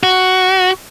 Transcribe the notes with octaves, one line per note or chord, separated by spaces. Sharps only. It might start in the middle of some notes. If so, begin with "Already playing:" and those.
F#4